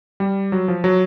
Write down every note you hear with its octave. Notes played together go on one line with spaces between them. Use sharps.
G3
F#3
F3
F#3